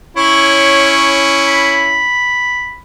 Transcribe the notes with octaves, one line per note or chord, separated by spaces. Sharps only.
C#4 E4 C#5
B5